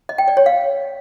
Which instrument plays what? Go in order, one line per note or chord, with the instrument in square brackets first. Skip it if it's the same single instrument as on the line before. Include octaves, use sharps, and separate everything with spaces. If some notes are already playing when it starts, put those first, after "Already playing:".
[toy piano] D#5
G5
D5
C#5
F5